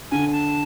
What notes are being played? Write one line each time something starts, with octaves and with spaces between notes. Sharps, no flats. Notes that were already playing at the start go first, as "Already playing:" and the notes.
D3 G#5
A5